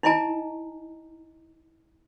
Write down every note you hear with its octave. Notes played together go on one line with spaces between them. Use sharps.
D#4 E4 D#5 G#5 A#5